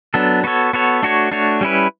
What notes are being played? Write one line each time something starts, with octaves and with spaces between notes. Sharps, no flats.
F#3 B3 D4 A4
B3 F#4 A4 C#5
B3 F#4 A4 C#5
A3 D4 F#4 C#5
A3 D4 F#4 C#5
G3 C#4 E4 B4